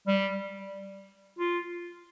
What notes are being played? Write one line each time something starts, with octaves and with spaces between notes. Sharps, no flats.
G3
F4